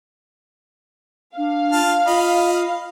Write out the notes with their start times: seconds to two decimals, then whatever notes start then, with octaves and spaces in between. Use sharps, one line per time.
1.37 D4 F5
1.72 F4 A5 F6
2.07 F4 D#5 B5